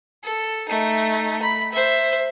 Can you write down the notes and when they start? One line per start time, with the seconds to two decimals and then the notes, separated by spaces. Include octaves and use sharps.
0.24 A4
0.69 A3 D#4
1.42 B5
1.72 C5 E5